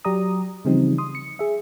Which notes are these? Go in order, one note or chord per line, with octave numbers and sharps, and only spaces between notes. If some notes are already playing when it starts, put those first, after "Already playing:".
F#3 G4 D5 A#5 D#6
C#3 E3 F3 G3 C4 D#4
C6 D#6
C#7
G#4 E5